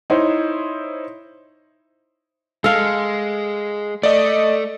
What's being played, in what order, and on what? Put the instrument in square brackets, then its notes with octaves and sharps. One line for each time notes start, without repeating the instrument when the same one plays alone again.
[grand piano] D#4 E4 C5 C#5
[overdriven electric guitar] G#3 [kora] A4 F5
[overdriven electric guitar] A3 [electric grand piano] D5 D#5